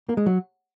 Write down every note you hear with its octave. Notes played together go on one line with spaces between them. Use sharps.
A#3
G#3
F#3